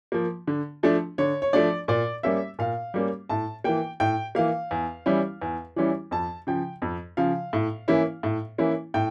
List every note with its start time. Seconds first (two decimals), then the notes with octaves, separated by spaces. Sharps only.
0.12 F3 A#3
0.47 D3
0.83 F3 A3 D4
1.18 D3 C#5
1.42 C#5
1.53 F3 A3 D4 D5
1.88 A#2 D5
2.23 G3 A#3 C#4 E5
2.59 A#2 F5
2.94 G3 A#3 C#4
3.29 A2 A5
3.64 E3 A#3 G5
4.00 A2 G5
4.35 E3 A#3 F5
4.71 E2
5.06 E3 G3 C#4 E4
5.42 E2
5.76 E3 G3 C#4 E4
6.11 F2 A5
6.47 C#3 F3 G5
6.82 F2
7.17 C#3 F3 F5
7.53 A2
7.88 E3 A#3 C#4 E4
8.23 A2
8.58 E3 A#3 C#4 E4
8.94 A2 G5